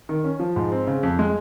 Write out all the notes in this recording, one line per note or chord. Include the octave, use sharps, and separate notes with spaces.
D#3
C#4
F3
G#2
C4
C#3
F2
G#3